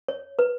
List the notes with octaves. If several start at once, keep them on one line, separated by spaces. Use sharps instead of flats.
C#5
B4